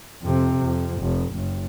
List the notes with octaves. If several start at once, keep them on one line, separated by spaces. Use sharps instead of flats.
F2 C3
F2
F1
F#1